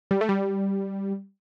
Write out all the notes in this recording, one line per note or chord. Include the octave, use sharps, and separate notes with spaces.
G3
A3
G3